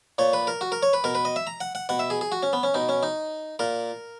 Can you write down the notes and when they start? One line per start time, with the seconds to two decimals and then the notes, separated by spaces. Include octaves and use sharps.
0.18 A#2 C#5
0.33 B4
0.47 A#4
0.61 F#4
0.72 A#4
0.83 C#5
0.93 B4
1.04 B2 A#4
1.15 B4
1.25 D#5
1.36 E5
1.47 A#5
1.61 F#5
1.75 F#5
1.89 B2 F#5
1.99 E5
2.10 G#4
2.21 G#4
2.32 F#4
2.43 C#4
2.53 B3
2.63 C#4
2.74 B2 D#4
2.89 C#4
3.03 D#4
3.59 A#2 A#4